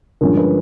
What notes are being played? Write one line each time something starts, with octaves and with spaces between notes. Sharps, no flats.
G2 D3 F3 G#3 C#4 A#4
B4